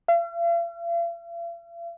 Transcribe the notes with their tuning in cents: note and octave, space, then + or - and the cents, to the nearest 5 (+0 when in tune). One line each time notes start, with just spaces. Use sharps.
F5 -45